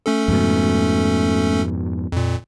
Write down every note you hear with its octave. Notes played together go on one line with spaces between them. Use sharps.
A3 C#4 A4
F2 G#2 B2
F2 A#2